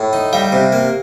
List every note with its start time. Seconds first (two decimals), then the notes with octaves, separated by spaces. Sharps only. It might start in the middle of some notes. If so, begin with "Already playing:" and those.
Already playing: A2
0.13 D#4
0.33 G3 F5
0.52 C3
0.72 A#3